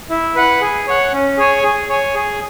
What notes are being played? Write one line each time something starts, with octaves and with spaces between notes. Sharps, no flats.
E4
B4 F#5
G#4
C#5 F#5
C#4
G#4 C#5 G#5
G#4
C#5 G#5
G#4